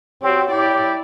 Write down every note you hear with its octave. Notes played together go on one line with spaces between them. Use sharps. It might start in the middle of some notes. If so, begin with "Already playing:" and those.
C4 F#4 G4 C#5
E4 G4 D5